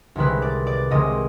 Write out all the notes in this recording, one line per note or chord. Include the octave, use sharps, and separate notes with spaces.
C2 C3 D#3 G#3 B4
D5
D5
C2 C3 D#3 G#3 D#5